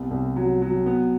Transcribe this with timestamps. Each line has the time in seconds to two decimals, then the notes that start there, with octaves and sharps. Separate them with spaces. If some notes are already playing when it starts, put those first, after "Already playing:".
Already playing: C2 B3
0.11 C2
0.36 F#3
0.62 F#3
0.86 B3